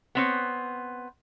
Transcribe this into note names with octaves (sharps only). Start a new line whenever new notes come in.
B3 C4 C#5